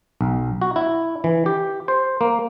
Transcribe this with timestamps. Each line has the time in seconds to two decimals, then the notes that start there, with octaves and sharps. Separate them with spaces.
0.21 B1
0.62 F#4
0.76 E4
1.24 E3
1.46 G4
1.88 C5
2.21 A#3